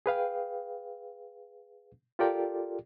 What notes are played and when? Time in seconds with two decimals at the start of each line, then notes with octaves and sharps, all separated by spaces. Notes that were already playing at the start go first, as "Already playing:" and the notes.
0.06 G#4 B4 F5 G5
2.19 F4 G4 A4 A#4 D5 G5